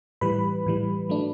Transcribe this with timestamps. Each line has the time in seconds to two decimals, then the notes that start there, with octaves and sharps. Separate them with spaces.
0.21 A2 E3 G3 B4 B5
0.66 A2 E3 G3
1.09 F#3 A3 D4